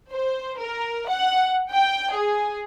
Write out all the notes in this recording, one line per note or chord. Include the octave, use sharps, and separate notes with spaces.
C5
A#4
F#5
G5
G#4